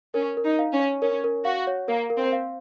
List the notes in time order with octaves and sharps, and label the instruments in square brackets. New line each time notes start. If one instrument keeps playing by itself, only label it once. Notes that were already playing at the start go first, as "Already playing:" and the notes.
[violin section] C#4 [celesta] A#4
[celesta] A#4
[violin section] D#4
[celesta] F5
[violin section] C#4
[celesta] C#5
[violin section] C#4 [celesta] A#4
[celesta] A#4
[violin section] F#4 [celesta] F5
[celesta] C#5
[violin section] A#3 [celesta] A#4
[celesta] A#4
[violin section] C4
[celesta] F5